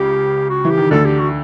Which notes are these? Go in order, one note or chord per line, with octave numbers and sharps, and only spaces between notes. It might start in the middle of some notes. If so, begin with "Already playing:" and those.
Already playing: C#2 C#3 G4
F#4
E3
G4
D#3
D2 D3 A4
G4
F#4